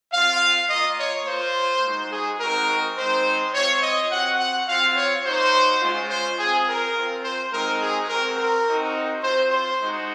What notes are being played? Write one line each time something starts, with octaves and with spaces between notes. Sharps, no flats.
C4 F4 F5
A#3 F4 D#5
C#5
A#3 F4 C5
G#3 D#4 F#4
G#4
G#3 C4 D#4 F#4 A#4
G#3 C4 D#4 C5
C4 F4 C#5
D#5
C4 F#4 F#5
F#5
C4 F4 F5
C#5
A#3 D#4 F#4 C5
G#3 C#4 F4
C5
C4 F4 G#4
A#4
C4 F4
C5
G#3 C4 D#4 F#4 A#4
G#4
C4 F#4 A#4
A#4
C4 D#4 F#4
C4 F4 C5
C5
G#3 D#4 F#4